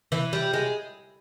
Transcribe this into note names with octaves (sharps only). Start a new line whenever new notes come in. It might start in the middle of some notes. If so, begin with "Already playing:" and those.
E3
G3
G#3